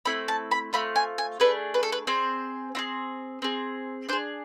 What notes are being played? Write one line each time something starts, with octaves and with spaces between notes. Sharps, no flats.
A3 C4 E4 B5
A5
B5
A3 C4 F4 B5
G#5
G#5
A3 D4 G#4 B4
B4
A4
B4
C4 G#4 C5
C4 E4 G#4
C4 G#4
D4 G#4 C5